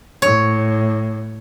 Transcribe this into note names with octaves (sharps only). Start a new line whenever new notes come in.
A2 C#5